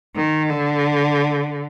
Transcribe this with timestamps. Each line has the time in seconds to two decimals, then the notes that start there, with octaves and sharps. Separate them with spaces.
0.16 D#3
0.49 D3